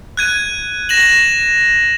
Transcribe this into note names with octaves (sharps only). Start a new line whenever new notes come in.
F#6 G#6 D#7
A#6 E7 F#7